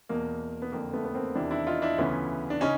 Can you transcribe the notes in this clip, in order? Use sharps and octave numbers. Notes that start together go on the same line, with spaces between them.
E2 B2 A#3
B3
F2 D3 A#3
A3 B3
B3
A#3 C4
E2 C3 D#3 D4 E4
D4 E4
D#4 F4
D4 E4
D2 C#3 E3 B3 C#4
D4
C#3 C#4 D#4